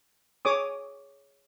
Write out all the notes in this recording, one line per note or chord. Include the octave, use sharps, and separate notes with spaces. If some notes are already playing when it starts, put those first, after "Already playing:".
G#4 C#5 D6 D#6